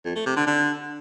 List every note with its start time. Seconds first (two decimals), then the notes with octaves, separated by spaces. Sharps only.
0.05 F2
0.16 A3
0.26 C3
0.36 D3
0.47 D3